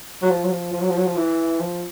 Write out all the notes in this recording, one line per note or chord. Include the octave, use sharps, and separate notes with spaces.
F#3
F3
F#3
F3
F3
F#3
F3
F#3
F3
E3
F3